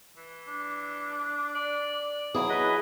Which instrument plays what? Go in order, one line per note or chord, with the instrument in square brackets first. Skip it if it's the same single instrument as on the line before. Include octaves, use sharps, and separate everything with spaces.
[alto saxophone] E3
[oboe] D4
[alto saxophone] D5
[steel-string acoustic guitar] F#3 E4 G#4
[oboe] B4 [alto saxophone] D#5